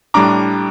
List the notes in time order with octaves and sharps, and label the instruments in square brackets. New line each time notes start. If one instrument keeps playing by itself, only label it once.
[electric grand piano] A2 G3 D4 [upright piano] A#5 D6